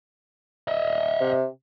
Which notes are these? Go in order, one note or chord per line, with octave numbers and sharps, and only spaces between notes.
D#5 E5
C3